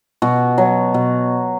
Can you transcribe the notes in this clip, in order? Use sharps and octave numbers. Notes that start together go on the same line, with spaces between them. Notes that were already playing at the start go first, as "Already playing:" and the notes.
B2 F#4
F#3
B2